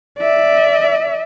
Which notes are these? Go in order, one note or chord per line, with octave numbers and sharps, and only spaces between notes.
D5 E5